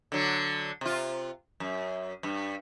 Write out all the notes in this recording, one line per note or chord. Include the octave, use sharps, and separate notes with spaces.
D3 F#3
C3 F4
F#2
G2